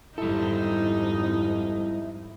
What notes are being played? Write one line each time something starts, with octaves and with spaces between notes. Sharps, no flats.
G#1 F2 G3 D#4 E4 A4